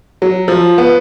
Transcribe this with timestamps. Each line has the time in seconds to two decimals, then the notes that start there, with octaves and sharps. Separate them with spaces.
0.22 F#3
0.48 F3
0.78 B3